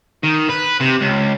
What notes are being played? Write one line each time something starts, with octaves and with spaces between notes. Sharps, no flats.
D#3
B4
C3
C#2